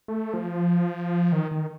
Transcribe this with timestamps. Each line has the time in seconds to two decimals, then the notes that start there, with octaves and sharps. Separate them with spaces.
0.08 A3
0.34 F3
1.32 D#3
1.51 D#3